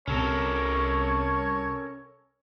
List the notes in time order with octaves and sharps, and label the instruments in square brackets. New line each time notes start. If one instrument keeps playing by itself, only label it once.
[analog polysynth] C2 C3 [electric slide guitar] C#4 A4 A#4 [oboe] C#5